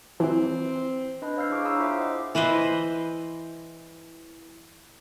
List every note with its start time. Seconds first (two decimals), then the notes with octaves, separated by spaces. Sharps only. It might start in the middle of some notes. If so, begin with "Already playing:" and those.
0.20 E3 C4
1.22 D4 B4 C5 D#5 B5
1.37 C#5 F5 E6 F6 G6 C7
1.50 D4 E4 G#4 C#6 D6 C7
1.64 F5 G#5 A#5 B5 D#6 E6
1.80 E4 F4 C5 E5 D6
1.97 D#5 F#5
2.35 E3 B4 C5 D#5